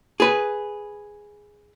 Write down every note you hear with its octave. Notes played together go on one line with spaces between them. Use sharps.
G#4 B4